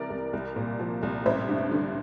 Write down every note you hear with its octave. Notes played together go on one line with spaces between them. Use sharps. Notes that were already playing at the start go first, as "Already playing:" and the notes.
Already playing: C2 C3 E3 A#4 D5 E5
C2
C2
A#2
F3
C2
A1 C5 E5
G2
D3